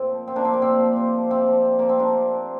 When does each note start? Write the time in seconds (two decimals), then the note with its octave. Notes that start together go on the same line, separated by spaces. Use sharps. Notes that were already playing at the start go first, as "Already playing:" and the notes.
Already playing: A#2 C4
0.10 F3
0.27 A#2 C4
0.36 A#3 D4
0.45 F3 C4
0.54 A#3
0.62 A#2 C4
0.79 F3
0.96 C3
1.14 F3
1.31 C3 C4
1.48 F3
1.65 C3
1.79 F3 A#3
1.89 C4
1.99 C3 A#3 D4
2.17 F3
2.33 C3